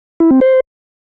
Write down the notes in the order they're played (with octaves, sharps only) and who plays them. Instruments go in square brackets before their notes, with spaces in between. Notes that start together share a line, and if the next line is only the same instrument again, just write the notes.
[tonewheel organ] E4
C4
C5